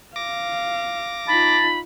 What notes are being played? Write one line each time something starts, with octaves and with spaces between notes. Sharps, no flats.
F5 D6 A#6
D#4 F4 A5 B5